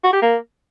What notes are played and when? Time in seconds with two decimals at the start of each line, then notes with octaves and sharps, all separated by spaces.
0.04 F#4
0.13 G4
0.22 A#3